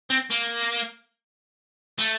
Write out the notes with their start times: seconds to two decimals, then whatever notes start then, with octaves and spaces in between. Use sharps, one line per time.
0.10 C4
0.31 A#3
1.99 A3